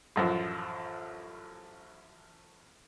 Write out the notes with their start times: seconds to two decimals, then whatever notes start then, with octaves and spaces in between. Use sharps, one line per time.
0.16 A1 F#2 F3